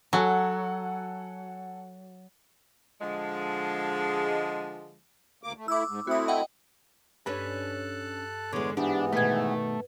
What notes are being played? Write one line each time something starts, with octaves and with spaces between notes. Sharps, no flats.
F#3 A4 F#5 G#5
D3 F3 G#3
D2 A#3 D6
A3
A3 E4 D6 E6
G#2
A3 C4 E4 F#4 D#6
D#5 F#5 G5
G2 C#4 D4 A4 B4 A5 F#6
E2 D3 G#3 C#5 D6
G#2 E3 B3 D4 G4
B2 D#3 A3 B4 G#6